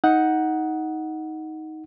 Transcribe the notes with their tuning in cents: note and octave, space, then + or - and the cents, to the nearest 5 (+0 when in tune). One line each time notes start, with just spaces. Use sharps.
D#4 +15 F#5 +0